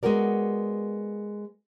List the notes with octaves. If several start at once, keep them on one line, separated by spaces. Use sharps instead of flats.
G#3 B3 F#4 A#4 D5